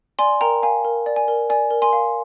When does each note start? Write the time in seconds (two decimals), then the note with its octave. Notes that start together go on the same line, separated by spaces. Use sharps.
0.19 D5 G#5 C6
0.41 A#4 G5 A#5
0.63 F5 G#5
0.85 A#4
1.06 D5
1.16 G#5
1.28 A#4
1.50 D5 G#5
1.71 A#4
1.82 G#5 C6
1.93 F5